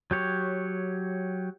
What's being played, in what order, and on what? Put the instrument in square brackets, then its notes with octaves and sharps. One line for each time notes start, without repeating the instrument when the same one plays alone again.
[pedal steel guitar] F#3 G4 C#5